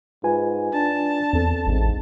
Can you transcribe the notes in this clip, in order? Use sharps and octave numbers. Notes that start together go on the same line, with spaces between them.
G#2 F4 B4 G#5
D4 A5
E2 C4 A4
A1 G#2